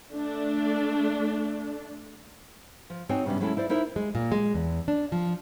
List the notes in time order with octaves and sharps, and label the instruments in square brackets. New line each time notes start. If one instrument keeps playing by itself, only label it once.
[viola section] A3 D4
[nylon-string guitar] F3
C4 D#4 F#4 C#5 G#5
G2 C3 G3 B3 C#4
F#3 G#3 A3 C#4 E4 A5
E4 C5 D5
D#4 E4 A#4 C5 E5
G#3
A#2
G#3
E2
D4
F3